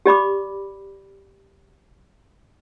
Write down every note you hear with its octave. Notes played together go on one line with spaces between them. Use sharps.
G4 D5 B5 D6